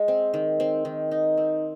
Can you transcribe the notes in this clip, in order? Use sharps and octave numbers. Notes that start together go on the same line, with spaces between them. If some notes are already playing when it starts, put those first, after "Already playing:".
Already playing: G#3
C4
D#3
C4
D#3
D#4
C4